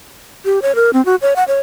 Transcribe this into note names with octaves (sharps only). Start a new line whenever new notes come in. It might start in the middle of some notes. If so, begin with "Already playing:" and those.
G4
C#5
A#4
C4
F#4
C#5
F#5
C#5